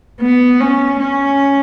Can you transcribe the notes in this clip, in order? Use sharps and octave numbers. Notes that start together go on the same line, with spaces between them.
B3
C#4
C#4